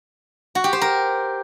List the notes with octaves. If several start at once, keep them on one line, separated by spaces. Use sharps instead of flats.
F#4
G4
C5
A#4